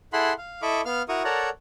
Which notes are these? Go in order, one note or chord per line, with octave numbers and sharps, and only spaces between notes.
E4 G#4 A4 F#5 B5 C6
F5
E4 A4 D#5 B5 C#6 D6
B3 F5 F6
E4 F#4 A#4 C#6 D#6
A4 A#4 C#5 D5 F#5 A#5